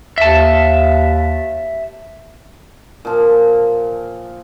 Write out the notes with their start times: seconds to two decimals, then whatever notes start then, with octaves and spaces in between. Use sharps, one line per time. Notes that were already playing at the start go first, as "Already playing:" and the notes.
0.18 D#2 E5 A5
3.05 A#2 F3